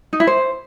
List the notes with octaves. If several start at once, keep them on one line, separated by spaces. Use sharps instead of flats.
D#4
E4
C5